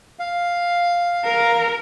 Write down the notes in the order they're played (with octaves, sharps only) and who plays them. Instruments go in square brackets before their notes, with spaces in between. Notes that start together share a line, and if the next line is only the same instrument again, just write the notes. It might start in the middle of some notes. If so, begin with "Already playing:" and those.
[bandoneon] F5
[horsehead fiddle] A#4